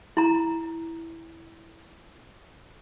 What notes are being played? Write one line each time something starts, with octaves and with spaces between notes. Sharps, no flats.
E4 A#5